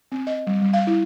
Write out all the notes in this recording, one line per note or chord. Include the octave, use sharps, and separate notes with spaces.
C4
D#5
G3
G3
F5
E4